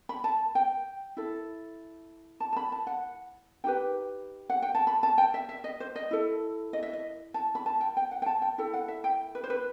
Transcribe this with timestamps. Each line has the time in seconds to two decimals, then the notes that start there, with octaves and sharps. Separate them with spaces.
0.09 B5
0.24 A5
0.55 G5
1.17 E4 A4
2.40 A5
2.53 A5
2.56 B5
2.72 A5
2.87 F#5
3.64 D#4 G4 B4 G5
4.50 F#5
4.62 G5
4.75 A5
4.87 B5
5.03 A5
5.18 G5
5.34 E5
5.49 E5
5.64 D#5
5.80 C5
5.96 D#5
6.11 E4 A4
6.73 D#5
6.83 E5
6.93 D#5
7.34 A5
7.55 B5
7.66 A5
7.81 G5
7.97 G5
8.11 F#5
8.22 G5
8.26 A5
8.42 G5
8.58 E4 A4 G5
8.74 F#5
8.88 E5
9.04 G5
9.35 B4
9.44 C5
9.50 B4